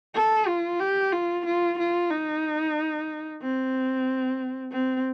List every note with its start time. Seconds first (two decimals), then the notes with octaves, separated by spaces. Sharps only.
0.15 A4
0.47 F4
0.80 G4
1.13 F4
1.46 F4
1.79 F4
2.11 D#4
3.42 C4
4.72 C4